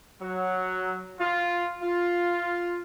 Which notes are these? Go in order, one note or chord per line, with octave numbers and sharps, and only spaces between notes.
F#3
F4
F4